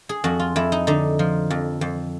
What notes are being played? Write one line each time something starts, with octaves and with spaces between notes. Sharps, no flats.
G#4
F2 F#4
F4
F2 E4
D#4
D3 D#4
F3
F2
F2